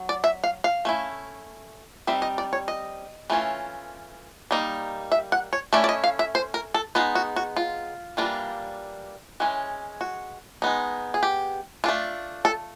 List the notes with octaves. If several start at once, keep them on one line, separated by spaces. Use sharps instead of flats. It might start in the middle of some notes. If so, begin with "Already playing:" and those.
Already playing: F#3
D5
E5
F5
F5
A3 C#4 E4
G3 C4 D#4 E5
D#5
D5
C#5
D#5
E3 A3 C#4 F4
G3 A#3 D#4
E5
F#5
C#5
A3 C#4 E4 D5
D5
D#5
F5
E5
C5
A#4
A4
G#3 B3 D#4 F4
F#4
F#4
F4
E3 G3 A#3 D4 F4
E3 G#3 C#4
F#4
G#3 B3 D#4
G#4
G4
A3 D4 F4
A4